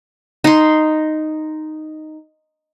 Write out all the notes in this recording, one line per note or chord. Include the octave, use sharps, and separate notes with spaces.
D#4 C6